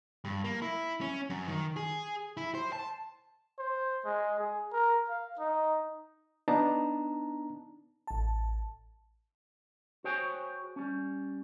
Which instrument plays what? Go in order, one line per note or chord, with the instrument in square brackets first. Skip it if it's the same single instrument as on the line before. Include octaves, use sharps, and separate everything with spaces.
[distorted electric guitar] G2
A#3
E4
C#4
F#2
D#3
G#4
E4
C5
A5
[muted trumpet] C5
G#3
G#4
A#4
F5
D#4
[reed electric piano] B3 D4 D#4 A5 A#5
[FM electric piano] A1 A5
[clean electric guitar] F#4 G#4 C5 C#5 G5 G#5
G3 C#4